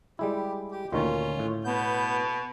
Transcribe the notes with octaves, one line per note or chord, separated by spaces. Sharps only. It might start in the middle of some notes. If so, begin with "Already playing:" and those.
G3 G#3 E4 G4
G4
D2 A#2 D#3 C#4 F4
A2
B2 B3 G6